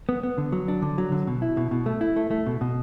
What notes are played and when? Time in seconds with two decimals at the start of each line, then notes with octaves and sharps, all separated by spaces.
0.09 B3
0.23 B3
0.38 D3
0.52 F#3
0.68 D4
0.82 D3
0.98 F#3
1.12 D3
1.27 B2
1.42 E4
1.57 B2
1.71 B2
1.86 A3
2.01 E4
2.16 A3
2.31 A3
2.47 B2
2.61 B2